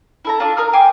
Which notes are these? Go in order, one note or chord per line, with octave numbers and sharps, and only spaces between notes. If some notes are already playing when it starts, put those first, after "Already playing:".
E4 A4 A#5
D4 F4 A4 D5
A#4 A#5 D#6 F6
G5 G#5 C6 D6